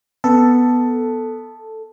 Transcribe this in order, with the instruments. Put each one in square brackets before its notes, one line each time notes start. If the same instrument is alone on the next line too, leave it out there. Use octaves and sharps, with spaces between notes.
[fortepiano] B3 [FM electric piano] A4